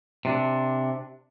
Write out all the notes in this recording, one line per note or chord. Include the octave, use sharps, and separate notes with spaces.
C3 D4